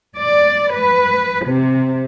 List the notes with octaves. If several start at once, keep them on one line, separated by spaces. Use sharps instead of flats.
D5
B4
C3